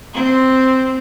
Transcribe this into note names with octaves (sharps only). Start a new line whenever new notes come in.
C4